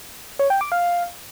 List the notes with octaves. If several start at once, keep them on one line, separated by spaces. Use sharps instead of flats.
C#5
G5
D6
F5